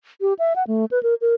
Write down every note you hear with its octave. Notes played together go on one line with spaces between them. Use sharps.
G4
E5
F#5
A3
B4
A#4
A#4